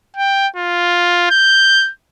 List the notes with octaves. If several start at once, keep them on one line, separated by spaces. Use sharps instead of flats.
G5
F4
G6